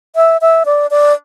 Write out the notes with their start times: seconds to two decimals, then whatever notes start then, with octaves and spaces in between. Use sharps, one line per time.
0.16 E5
0.41 E5
0.66 D5
0.91 D5